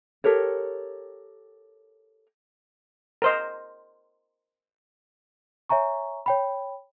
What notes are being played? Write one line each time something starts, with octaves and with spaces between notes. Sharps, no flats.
G4 A4 A#4 C#5
A#4 C5 D#5
C#5 E5 G#5 A#5 C#6
C#5 G5 B5